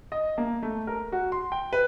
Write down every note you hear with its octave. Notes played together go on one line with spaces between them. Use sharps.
D#5
A#3
A3
A#4
F#4
C6
G5
B4